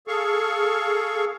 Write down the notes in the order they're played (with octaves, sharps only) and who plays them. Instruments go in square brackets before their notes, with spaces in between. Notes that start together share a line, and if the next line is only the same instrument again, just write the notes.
[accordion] G#4 A4 F5 C#6